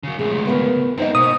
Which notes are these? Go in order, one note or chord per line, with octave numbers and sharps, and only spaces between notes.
C#3 F#3
C#2 A2 G#4
B3 A#4 B4
A#3 C4 D#4 C5 D#5
B2 D#6